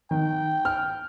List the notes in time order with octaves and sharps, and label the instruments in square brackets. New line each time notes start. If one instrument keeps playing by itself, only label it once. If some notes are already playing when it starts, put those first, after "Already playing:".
[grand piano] D#3 [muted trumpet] G5
[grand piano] F6